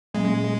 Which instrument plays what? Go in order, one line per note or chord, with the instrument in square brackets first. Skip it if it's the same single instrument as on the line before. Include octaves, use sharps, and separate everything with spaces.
[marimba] A#2 F#3 A#3 C#4 [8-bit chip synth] G#3